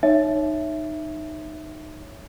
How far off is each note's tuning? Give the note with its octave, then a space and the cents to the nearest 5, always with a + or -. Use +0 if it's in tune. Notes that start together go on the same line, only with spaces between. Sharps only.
D#4 -15 C#5 +0 E5 +0